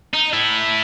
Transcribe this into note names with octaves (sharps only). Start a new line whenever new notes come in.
D#4
E4 A4